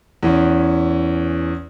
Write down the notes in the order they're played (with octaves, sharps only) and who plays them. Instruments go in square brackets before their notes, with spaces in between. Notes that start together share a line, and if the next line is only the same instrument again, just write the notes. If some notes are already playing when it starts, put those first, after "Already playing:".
[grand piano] E2 E3 C#4